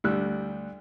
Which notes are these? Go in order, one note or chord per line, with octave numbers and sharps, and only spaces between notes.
D2 G3 E6 F#6